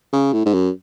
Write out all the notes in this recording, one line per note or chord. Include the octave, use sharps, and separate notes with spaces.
C#3
A2
G#2
F#2